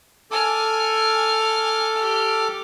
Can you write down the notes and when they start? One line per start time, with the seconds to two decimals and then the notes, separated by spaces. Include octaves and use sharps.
0.31 A4 G#5 D6 F6
1.96 G4 F6